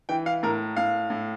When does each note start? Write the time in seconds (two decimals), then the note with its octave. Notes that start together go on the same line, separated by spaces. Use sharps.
0.09 E3 G5
0.26 F5
0.43 A2 A#4
0.77 A2 F5
1.10 A2